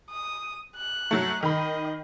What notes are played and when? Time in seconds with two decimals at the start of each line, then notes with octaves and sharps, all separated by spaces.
0.10 D#6
0.76 F#6
1.11 F#3 A3
1.43 D#3 D#5 B5